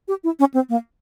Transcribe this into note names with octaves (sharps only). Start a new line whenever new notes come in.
G4
E4
C#4
C4
A#3